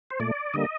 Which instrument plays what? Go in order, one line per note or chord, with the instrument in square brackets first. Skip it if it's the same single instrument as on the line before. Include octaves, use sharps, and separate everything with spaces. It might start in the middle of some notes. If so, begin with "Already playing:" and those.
[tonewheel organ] C5
A#2 A3 D5
D3 G3 A#3 D#5